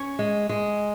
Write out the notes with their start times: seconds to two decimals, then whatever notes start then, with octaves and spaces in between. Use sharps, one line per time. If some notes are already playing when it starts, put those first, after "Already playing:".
Already playing: C#4 C#5
0.19 G#3
0.49 G#3